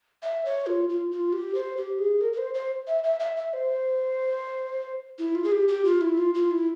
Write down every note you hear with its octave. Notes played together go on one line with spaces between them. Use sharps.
E5
C#5
F4
F4
F4
G4
C5
G4
G#4
A#4
A#4
C5
C5
E5
E5
E5
E5
C5
E4
F4
G#4
G4
G4
F4
E4
F4
F4
E4